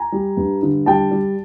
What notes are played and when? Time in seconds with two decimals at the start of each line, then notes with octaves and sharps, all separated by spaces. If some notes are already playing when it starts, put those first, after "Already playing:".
Already playing: G#5 A#5
0.12 G3
0.37 G2
0.62 D3
0.86 G3 G5 A5
1.11 G3